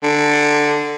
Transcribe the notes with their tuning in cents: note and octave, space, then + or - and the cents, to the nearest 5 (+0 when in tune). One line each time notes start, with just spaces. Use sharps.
D3 +10